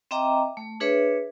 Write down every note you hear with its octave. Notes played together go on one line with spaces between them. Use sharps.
C4 D#5 E5 G5 A#5 D6
A3
D4 G#4 B4 C#5 E5